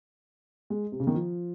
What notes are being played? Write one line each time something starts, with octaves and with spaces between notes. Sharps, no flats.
G#3
C3
C#3
D#3
F3